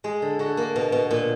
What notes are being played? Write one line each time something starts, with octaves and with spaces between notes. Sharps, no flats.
G#3 G#4
D3
D3 F#4
A#3
B2
B2
A#2